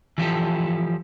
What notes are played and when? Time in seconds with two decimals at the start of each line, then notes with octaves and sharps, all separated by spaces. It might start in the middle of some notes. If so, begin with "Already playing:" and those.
0.18 E3 F3 G4 A4